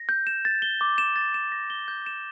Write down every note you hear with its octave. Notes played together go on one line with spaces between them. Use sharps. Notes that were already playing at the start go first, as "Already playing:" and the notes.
Already playing: A#6
G6
E7
A6
G7
D6
E7
A6
E7
A#6
G7
G6
E7